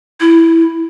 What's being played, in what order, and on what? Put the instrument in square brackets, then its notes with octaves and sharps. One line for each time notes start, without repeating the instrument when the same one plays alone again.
[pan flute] E4